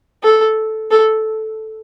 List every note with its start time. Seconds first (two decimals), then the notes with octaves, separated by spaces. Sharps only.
0.23 A4
0.91 A4